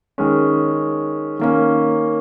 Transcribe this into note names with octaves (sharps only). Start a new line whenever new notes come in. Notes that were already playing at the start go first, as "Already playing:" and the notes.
D#3 G#3 C#4
D#3 A#3 C#4